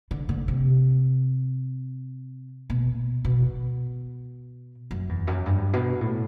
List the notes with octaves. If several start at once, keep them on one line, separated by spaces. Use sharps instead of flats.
D3
D3
C3
B2
B2
F#2
E2
F#2
G2
B2
A2